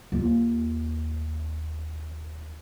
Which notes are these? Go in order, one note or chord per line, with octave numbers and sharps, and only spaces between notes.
D#2 F4